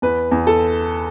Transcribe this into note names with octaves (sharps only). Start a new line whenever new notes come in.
E2 B4
E2
A4